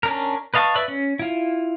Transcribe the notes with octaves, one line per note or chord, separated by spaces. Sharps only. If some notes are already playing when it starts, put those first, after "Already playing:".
C#4 D4 A#4
B4 D#5 F5 A5 C#6
B4 D5 E5
C#4
E4 F4